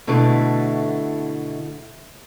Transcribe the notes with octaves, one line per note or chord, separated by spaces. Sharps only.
B2 D3 A3 E4 A4